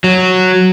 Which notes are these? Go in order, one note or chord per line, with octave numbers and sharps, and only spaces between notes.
F#3